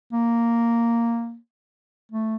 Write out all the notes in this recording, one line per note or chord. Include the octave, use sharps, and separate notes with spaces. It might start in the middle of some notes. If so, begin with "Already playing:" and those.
A#3
A3